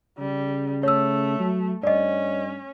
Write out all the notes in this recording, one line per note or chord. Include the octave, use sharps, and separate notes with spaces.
C#3 G3
A3 C#5 E6
F#3
G2 C#4 D5 D#5